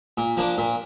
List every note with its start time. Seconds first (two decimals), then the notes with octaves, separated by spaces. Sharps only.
0.18 A#2
0.37 F3 A#3 D4
0.58 A#2